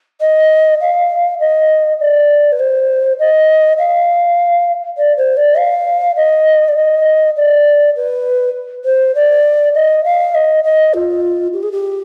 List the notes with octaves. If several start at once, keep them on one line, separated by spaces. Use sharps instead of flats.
D#5
F5
D#5
D5
B4
C5
D#5
F5
D5
C5
D5
F5
D#5
D5
D#5
D5
B4
C5
D5
D#5
F5
D#5
D#5
F4
G4
G#4
G4